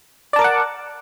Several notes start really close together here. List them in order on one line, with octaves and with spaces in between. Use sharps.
D5 A5 A#4 D6 F#5